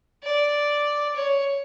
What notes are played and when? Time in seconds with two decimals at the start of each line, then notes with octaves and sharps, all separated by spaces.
0.23 D5
1.15 C#5